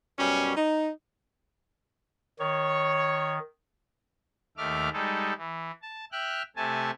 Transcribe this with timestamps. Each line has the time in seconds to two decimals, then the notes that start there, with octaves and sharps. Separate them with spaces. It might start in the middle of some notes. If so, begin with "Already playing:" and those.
0.19 F#2 B2 G3 C#4
0.57 D#4
2.39 D#3 C#5
4.57 D#2 D#3 A3 E5 D6 F6
4.93 G3 G#3 D#4 A4
5.38 E3
5.82 A5
6.12 E5 G5 F6 F#6
6.56 C3 A3 G#5 A5